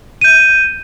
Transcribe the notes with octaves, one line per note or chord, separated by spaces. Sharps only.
G6 D#7